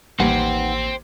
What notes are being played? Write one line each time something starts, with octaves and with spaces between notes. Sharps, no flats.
A1 D#2 D#4 B4 C5 F#5 G5